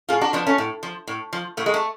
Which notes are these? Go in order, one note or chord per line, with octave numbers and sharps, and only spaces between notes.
A2 F4 G#4
D4 F#4
F3 B3 D4
A3 C#4
A2
F3
A2
F3
A2 A3
G#3
A3